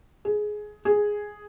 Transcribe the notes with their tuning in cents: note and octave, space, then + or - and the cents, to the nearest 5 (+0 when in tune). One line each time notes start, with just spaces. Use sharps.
G#4 +15
G#4 +0